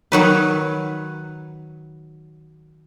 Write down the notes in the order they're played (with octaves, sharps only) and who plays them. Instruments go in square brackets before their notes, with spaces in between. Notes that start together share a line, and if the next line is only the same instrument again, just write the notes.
[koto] D#3 F#3 B4